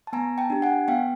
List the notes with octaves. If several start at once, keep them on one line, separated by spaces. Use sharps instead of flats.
A5
B3 G#5 A#5
G5 A5
D4 G4
F#5 G#5
B3 F5 G5